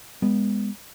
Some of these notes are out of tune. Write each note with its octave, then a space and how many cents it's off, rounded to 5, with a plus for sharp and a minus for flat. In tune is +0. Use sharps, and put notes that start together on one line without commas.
G#3 -25 B3 -5